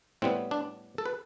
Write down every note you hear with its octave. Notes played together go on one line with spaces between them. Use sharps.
A2 G3 B3 C4
D4
A4
B4